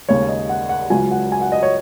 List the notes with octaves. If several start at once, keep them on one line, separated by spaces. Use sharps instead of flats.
D#2 C#3 G#3 C#5
D#5
F#5
F#5
C#2 C#3 F#3 G#5
F#5
G#5
F#5
D#5
C#5